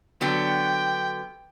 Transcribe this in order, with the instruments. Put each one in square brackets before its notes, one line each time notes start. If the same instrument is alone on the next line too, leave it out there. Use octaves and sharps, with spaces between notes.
[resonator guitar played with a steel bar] D3 F#3 B3 [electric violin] G5